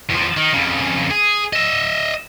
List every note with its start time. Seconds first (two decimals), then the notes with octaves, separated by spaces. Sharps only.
0.10 E2 F3
0.37 D#3
0.53 F2 C#3
1.10 G#4
1.53 D#5 E5